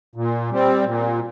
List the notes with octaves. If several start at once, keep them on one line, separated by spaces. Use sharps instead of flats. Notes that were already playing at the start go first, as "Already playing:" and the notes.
A#2
G3 C4
A#2